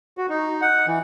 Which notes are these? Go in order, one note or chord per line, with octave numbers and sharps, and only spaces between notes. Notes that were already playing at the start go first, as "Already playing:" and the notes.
F#4
D#4
F#5
E3